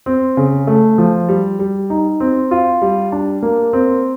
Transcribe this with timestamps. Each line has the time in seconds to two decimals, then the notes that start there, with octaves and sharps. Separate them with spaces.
0.06 C4
0.37 C#3
0.67 A3
0.98 F3
1.29 G3
1.59 G3
1.90 D#4
2.20 C4
2.51 F4
2.82 G3
3.12 D4
3.43 A#3
3.73 C4